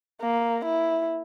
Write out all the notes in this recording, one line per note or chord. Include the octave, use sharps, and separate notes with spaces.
A#3
E4